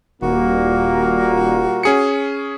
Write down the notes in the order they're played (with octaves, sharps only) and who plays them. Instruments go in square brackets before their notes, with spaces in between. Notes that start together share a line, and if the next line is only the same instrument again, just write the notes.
[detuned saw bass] D#1 [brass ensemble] A#2 G3 A#3 [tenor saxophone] F#4
[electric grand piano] C#4 G#4 C#7